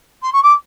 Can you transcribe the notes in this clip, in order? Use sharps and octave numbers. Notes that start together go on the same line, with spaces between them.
C6
C#6
D6